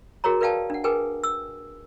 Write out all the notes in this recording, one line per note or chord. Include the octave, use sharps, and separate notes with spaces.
F#4 G#4 A#4 C#5 A#5
A#4 B4 D5 F5 G5 A5
D4 F#5
G#4 A#4 B4 G5 G#5
E6